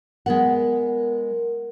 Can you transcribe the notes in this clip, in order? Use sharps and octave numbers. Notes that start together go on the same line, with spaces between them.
G#3 B3 A#4 F#5